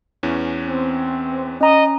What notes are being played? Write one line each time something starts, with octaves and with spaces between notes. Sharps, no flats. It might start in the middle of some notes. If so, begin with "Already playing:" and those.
E2 E3 C#4
C4
C#4 D#5 A#5